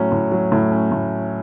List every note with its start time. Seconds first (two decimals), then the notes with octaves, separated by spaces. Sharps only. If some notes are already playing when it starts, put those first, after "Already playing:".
Already playing: A2 F#3 C#4
0.12 A2
0.32 F#3
0.52 A2
0.71 C#4
0.92 A2